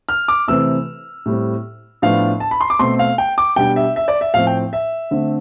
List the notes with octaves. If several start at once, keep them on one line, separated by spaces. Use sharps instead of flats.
F6
D6
C3 E3 A3 C4 E6
A2 G3 C4
A2 F3 B3 D4 F5
A5
B5
C6
D6
B2 A3 C4 C6
F5
G5
D6
B2 G3 D4 G5
E5
E5
D5
E5
A2 F3 C4 F5
G5
E5
D3 A3 C4